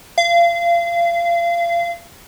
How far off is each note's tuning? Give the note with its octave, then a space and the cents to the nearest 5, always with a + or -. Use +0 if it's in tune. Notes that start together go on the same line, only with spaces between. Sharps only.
F5 -30